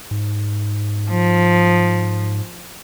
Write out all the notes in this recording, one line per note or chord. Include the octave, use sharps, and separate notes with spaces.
G#2
F3